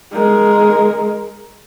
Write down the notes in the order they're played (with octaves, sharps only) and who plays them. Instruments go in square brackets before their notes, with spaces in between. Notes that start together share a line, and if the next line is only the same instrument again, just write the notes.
[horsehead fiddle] G#3 A#4